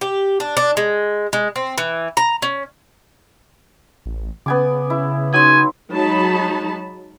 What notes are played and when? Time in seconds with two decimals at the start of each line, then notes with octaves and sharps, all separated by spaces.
0.01 G4
0.40 D4
0.57 D4
0.77 G#3
1.33 G#3
1.56 C4
1.78 E3
2.17 A#5
2.42 C#4
4.06 A1
4.46 C#3 B3 G#5 D6
4.90 E4
5.33 F#3 D#4 G#5 C6
5.91 F#3 G#3 D#4 A5 B5